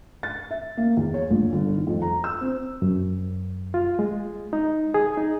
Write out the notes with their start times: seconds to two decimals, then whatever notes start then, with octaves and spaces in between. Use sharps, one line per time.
0.23 A6
0.51 E5
0.77 A#3
0.97 E2
1.14 C#5
1.30 A#1
1.53 G1
1.75 D#3
1.87 F2
2.02 A#5
2.24 E6
2.41 C4
2.82 F#2
3.74 F4
3.99 G#3
4.53 D#4
4.94 G#4
5.17 D#4